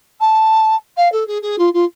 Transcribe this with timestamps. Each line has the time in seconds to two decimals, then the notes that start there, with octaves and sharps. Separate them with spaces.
0.20 A5
0.97 F5
1.12 A4
1.27 G#4
1.42 G#4
1.58 F4
1.73 F4